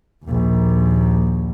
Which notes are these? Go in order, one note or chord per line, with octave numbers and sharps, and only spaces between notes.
A#1 D#2